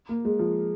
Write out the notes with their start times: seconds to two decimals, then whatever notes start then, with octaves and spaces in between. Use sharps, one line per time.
0.09 A#3
0.25 G#3
0.39 F3